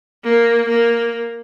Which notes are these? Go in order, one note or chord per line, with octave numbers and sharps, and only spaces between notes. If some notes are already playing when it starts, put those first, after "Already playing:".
A#3
A#3